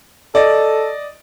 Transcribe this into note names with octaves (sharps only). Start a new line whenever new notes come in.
A4 D5 D#5